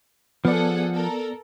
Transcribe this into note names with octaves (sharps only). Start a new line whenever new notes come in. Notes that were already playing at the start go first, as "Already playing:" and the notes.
F3 B3 G#4 A4 D5 F#5
A4 A#4